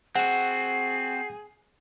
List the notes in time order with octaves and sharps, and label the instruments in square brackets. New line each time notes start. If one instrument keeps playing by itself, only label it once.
[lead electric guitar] C4 F#4 [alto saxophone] G#4 [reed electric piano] F#5 [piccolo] C7